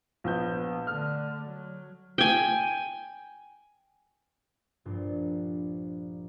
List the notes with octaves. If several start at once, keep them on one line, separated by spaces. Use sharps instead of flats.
A#1 B3 G6
D3 A3 F6
F#3
G5 G#5
A#1 G2 F4